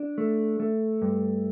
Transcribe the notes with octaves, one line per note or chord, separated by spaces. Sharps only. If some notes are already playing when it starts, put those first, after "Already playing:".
Already playing: D4
A3
A3
G2